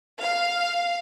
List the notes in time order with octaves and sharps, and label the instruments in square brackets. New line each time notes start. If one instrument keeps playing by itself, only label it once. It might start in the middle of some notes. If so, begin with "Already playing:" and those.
[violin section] F5